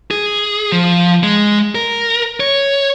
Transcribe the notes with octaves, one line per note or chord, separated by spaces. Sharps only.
G#4
F3
G#3
A#4
C#5